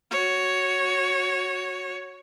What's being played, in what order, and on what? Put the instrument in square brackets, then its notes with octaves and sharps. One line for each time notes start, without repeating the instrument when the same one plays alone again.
[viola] F#4 C#5